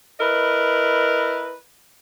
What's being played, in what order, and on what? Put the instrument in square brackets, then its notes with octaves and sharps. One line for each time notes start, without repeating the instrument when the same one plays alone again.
[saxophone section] E4 A#4 B4 D#5